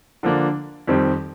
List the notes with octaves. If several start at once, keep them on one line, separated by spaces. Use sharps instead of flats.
D3 F3 A#3 D4
F2 D#3 G3 C4